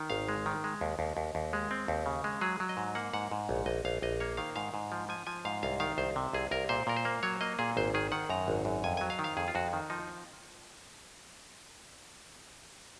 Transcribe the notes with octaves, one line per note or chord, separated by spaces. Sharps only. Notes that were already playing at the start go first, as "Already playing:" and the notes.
Already playing: D#3
G#1 F5
G#3
D#3
G#3
D#2
D#2
D#2
D#2
G#3
C4
D#2
C#3
G#3
F#3 G#4
F#3
D#5
G#2
A#3 F#5
G#2 F#5
G#2
A#1
A#1 D#5
A#1 F5
A#1 D#5
A#3 C#5
D#3 F5
G#2 F5
G#2
F3
F3 G#5
F3 G#5
G#2 F5
C2 F5
D#3 F5
C2 C5
C3
C2 G#4
C2 A#4
A#2 C5
A#2 A#4
C5
A#3
F#3 C#5
A#3 D#5
A#2 G#4
G#1 C5
D#3 G#4
D#3 F#5
F#2 A#5
G#1
F#2
F2 G#5
F#3 G#5
F5
D#3
F5
F2 G#4
F4
F2 F#4
D#3
F3 D#4